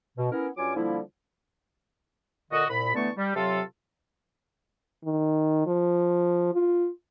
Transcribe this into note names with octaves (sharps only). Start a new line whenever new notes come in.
B2
B3 C#4 E4 A#4
G2 F#3 C#4 F4 G#5 D6
D3 F3 G3 A#3 E4
A#2 D3 F#4 D#5
C2 A#2 B5
D3 E3 A3 B3 A5 C#6
G3
C3 F#3 F4 A4
D#3
F3
F4